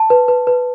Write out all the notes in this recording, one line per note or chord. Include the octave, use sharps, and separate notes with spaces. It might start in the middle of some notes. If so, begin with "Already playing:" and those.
Already playing: A5
B4
B4
B4